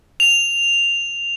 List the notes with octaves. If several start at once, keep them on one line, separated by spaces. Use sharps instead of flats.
F7